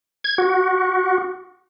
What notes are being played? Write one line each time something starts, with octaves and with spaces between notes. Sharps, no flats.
G#6
F#4